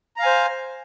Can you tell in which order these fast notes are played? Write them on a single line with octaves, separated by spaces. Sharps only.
A#5 F5 G#5 C5